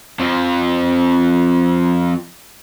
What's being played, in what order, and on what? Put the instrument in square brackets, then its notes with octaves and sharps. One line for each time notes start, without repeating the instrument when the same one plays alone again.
[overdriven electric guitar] F2 F3